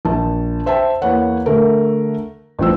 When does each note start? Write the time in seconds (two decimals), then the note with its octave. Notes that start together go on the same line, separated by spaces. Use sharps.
0.05 A#1 A5
0.66 C5 E5 G5 A5
1.02 E2 A#3 B4 C#5 F#5
1.46 D3 A3 A4 A#4
2.59 A1 G2 F3 C4 E6